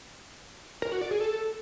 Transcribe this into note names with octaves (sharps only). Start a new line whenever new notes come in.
A#4
F#4
D5
G#4
A4